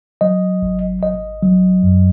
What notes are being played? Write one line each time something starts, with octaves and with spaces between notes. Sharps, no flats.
F#3 D#5
G#1
G#1 D#5
F#3
F#2